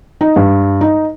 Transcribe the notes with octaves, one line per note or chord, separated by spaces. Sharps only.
D#4
G2
D#4